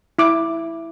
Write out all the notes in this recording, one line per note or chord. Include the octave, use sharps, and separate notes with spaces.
E4 D6